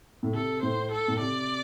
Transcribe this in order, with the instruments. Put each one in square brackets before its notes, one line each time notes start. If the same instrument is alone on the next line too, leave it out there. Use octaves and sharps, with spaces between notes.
[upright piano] A2
[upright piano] C3 [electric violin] A4
[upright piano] A2 [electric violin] C5
[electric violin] A4
[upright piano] A2
[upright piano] C3 [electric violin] D5